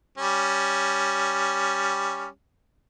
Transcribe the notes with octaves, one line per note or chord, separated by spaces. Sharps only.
G3 C#4